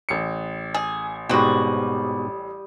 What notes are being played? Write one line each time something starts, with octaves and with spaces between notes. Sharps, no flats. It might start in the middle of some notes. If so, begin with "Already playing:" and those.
A1 C#7
G#4
G#2 B2 G3 C4 F#4 D#6